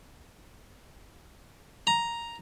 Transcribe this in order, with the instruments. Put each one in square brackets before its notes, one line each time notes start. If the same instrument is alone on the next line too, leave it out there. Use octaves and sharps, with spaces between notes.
[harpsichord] A#5